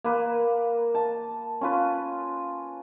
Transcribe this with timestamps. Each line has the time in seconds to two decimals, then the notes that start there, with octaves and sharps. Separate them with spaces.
0.04 A#3 B4
0.95 A5
1.61 C#4 F4 B4